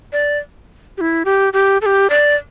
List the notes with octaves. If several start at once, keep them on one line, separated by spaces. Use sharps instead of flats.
D5
G4
E4
G4
G4
A4
G4
D5